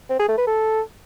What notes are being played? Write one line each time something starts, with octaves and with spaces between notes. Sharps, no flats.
C4
G#4
A3
B4
A4